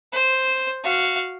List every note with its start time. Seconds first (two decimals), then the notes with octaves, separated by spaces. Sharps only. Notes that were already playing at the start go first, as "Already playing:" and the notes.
0.12 C5
0.84 F#4 F5